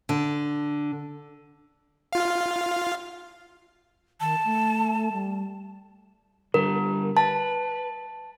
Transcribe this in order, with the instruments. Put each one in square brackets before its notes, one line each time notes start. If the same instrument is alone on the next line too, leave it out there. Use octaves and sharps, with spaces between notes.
[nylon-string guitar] D3
[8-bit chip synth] F4 F5
[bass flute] D#3 [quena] A5
[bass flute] A3
G3
[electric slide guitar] D3 G3 [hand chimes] A#4
[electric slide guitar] B4 [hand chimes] A5